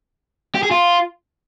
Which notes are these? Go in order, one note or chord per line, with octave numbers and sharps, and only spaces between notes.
G4
G#4
F4